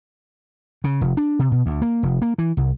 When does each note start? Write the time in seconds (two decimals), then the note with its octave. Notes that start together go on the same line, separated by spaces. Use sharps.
0.84 C#3
1.01 F1
1.17 D4
1.39 C3
1.52 B2
1.66 D2
1.82 A#3
2.03 F1
2.22 A#3
2.38 E3
2.57 C2